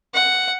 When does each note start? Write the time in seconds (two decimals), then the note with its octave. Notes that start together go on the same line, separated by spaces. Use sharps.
0.14 F#5